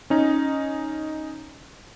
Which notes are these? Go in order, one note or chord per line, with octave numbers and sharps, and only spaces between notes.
C#4 D#4